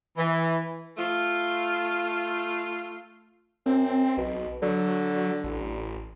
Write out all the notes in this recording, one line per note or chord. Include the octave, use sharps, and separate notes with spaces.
E3
A3 F4
F#2 C4
B1 B2
D3 F#3
A1